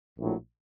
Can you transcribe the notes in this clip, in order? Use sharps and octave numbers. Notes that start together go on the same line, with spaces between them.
A#1 A2 F#3